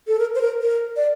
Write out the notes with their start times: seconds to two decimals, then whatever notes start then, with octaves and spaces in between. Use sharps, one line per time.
0.07 A4
0.19 A#4
0.35 C5
0.41 A#4
0.61 A#4
0.96 D5